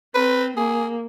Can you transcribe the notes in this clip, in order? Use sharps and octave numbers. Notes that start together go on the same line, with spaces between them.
C4 B4
A#3 G#4